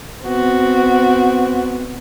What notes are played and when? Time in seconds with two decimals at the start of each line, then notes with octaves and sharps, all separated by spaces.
0.24 B3 C4 F#4